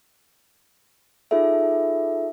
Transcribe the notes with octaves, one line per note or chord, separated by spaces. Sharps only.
D#4 F4 G#4 A4 E5